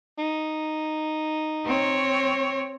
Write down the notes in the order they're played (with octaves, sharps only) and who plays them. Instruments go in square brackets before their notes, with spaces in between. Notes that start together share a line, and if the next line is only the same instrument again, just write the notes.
[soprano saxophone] D#4
[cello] C4 C#5